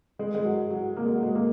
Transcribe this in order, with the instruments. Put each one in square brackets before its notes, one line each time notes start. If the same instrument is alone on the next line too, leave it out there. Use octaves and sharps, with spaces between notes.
[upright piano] G#3
G#3
F#3
F#3
A#3
G#3
F#3
G#3
A#3